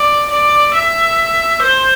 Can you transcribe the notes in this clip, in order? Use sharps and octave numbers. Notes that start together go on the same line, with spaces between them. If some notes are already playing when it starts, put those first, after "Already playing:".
Already playing: D5
D5
E5
C5